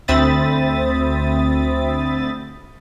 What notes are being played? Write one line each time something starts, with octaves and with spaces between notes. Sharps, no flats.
D2 C4 E5 B5 D#6 A6